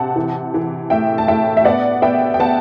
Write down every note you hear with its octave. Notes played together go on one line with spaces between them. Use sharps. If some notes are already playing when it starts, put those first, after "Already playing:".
Already playing: C3 F#5 A5
E3
E3
A2 E5 G5
A5
A2 E5 G5
E5
B3 D5 F#5
B3 E5 G5
G5
B3 F#5 A5